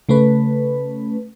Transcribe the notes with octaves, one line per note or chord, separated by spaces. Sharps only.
C#3 A3 C#4 B4